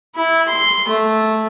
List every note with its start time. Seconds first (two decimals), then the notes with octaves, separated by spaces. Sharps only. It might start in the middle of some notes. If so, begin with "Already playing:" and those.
0.16 E4
0.48 C6
0.88 A3